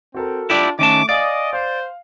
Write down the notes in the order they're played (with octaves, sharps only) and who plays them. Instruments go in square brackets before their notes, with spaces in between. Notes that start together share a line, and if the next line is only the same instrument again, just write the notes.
[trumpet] C4 [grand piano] F#4 A4 A#4
[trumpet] D4 [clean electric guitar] E4 G4 D5 [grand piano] F4
[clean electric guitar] D#3 C#4 A5 [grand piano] A3 [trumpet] D6
[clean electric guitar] D5 [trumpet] D#5 [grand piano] F5 G#5 D#6
[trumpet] C5 [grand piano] F5